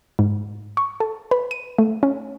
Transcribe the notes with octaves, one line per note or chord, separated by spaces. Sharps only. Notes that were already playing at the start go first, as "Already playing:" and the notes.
G#2
C#6
A4
B4
D#7
A3
C#4